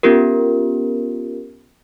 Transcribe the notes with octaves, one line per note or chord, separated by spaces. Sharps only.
B3 C#4 F4 G4 A#4